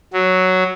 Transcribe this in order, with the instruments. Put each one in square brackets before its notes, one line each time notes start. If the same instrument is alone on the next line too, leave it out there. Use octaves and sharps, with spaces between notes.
[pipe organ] F#3